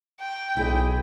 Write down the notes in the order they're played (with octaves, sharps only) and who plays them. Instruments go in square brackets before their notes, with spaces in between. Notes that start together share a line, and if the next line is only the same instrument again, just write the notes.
[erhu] G5
[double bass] B1 [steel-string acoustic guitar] E4 G#4 D#5